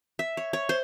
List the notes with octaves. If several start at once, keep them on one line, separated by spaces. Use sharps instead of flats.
E5
C#5
C#5
C5